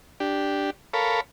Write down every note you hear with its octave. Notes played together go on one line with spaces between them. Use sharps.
D4 G4
A4 A#4 C#5 F5 B5